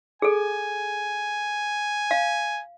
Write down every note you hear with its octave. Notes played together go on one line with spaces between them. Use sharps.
G#4 A4 G#5
F5